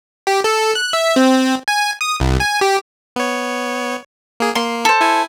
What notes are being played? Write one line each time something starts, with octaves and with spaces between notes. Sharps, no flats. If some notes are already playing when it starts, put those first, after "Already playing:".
G4
A4
F#6
E5
C4
G#5
D#6
C2
G#5
G4
B3 C#5
A#3 G#4
A#3 C6
A4 C5
E4 G#5